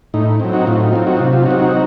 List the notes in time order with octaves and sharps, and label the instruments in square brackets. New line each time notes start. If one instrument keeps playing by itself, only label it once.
[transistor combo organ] A2 D#4
F#3 C4
D#4 F#4
A2 F4
D#4
F#3 C4 F4
D#4 F#4
C3 F4
F4
F#3 D#4 F#4
C4
D#4 F#4